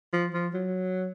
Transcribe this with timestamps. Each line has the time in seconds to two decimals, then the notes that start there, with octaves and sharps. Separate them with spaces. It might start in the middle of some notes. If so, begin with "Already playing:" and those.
0.13 F3
0.34 F3
0.54 F#3